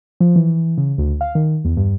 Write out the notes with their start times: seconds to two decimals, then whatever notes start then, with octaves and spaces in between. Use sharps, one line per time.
0.20 F3
0.36 E3
0.78 C#3
0.98 D2
1.21 F5
1.35 D#3
1.65 E2
1.77 G2